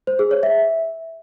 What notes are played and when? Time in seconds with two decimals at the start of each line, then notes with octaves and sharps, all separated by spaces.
0.07 C5
0.19 G#4
0.31 C#5
0.43 E5